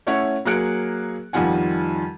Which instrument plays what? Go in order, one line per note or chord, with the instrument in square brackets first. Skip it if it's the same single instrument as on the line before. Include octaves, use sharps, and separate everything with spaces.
[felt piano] A3 C#4 E4 C#5 F#5
F#3 A#3 G#4 F#6 C#7 D7
F2 D#3 G3 F4 F#5 G#5